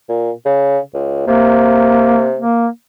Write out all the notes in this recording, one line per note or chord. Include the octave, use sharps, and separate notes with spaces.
A#2
C#3
C#2
C3 A#3
A#3